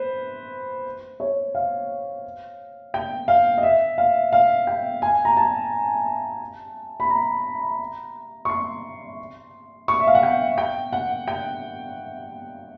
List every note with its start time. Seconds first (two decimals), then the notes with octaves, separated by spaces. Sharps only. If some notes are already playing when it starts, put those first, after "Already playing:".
Already playing: B4 C5
1.20 C#5
1.55 F5
2.94 G5
3.28 F5
3.58 D#5
3.63 E5
3.98 F5
4.32 F5
4.67 G5
5.02 G#5
5.25 A#5
5.37 A5
7.00 B5
7.10 A#5
8.45 C#6
8.49 C6
9.88 C#6
10.00 E5
10.07 F5
10.15 F#5
10.23 G5
10.58 G5
10.93 F#5
11.28 G5